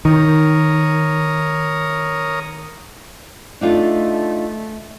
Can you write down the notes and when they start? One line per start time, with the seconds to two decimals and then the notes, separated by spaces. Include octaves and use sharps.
0.05 D#3 A#4 C#5 D#6
3.61 A3 D4 D#4 F4